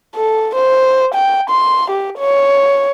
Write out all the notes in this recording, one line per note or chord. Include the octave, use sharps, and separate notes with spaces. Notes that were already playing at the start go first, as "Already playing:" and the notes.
A4
C5
G5
C6
G4
C#5